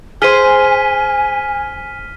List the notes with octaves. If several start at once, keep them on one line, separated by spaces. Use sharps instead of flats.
G#4 C5 G#5 F6 B6 D#7